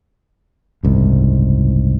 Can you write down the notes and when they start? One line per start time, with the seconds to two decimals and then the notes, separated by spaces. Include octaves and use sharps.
0.83 F#1 C2 G#2